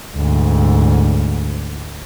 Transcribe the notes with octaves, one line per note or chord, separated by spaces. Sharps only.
D2 G#2